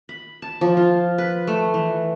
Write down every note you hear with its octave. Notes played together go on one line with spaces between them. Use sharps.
B5
A5
F3
F4
B4
A3
E3